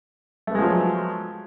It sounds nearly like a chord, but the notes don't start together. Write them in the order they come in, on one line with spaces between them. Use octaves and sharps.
A3 B3 G#3 F3 F#3